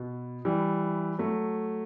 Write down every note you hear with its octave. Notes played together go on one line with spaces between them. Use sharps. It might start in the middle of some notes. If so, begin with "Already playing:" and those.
Already playing: B2
E3 G3
F#3 A3